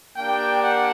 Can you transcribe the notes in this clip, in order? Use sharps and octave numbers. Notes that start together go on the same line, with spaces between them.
A#3 D4 G4 G5
F#5